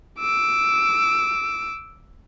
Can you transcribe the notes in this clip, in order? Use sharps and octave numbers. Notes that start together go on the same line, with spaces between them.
D6 E6